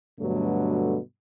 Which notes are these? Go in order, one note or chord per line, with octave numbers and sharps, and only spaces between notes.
G2 B2 D3 F#3 A3